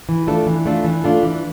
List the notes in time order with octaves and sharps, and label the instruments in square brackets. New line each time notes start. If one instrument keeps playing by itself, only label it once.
[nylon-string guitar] E3
A3 D4 F4 A4
E3
A3 D4 F4 A4
E3
A3 D4 F4 A4
E3